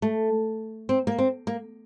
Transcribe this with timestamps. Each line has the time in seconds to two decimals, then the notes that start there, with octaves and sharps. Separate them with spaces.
0.02 A3
0.89 C4
1.07 A#3
1.18 C4
1.47 A#3